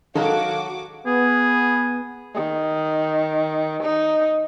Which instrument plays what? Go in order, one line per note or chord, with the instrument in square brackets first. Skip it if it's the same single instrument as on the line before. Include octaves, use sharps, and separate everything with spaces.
[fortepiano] D#3 G#3 [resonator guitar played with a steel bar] F#3 A4 [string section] F#4 D6 [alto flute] F5
[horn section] B3 [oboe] G#4
[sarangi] D#3
D#4